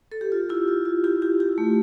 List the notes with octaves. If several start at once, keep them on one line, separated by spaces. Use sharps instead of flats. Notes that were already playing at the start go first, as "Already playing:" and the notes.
A4
G4
F4
E4 G4
F4
F4
E4 G4
E4 G4
E4 G4
A3